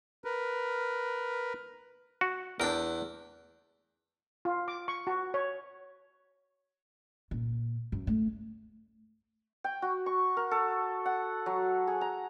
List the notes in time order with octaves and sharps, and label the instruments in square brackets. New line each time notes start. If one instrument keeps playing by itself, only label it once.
[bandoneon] A#4 B4
[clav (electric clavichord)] F#4
[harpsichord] E2 G5 [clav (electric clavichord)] D4 A#4
[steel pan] F4
D6
C#6
F#4
C#5
[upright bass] A#2
F#2
A3
[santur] G5
F#4
C#6
A#4
A4
F#5
F#3
G#4
A#5